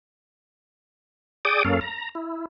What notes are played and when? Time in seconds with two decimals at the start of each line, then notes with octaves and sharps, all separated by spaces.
1.45 G#4 D5 G5 D6 D#6
1.65 F#2 A#3 C#4 A4 F5
1.81 A#5
2.15 E4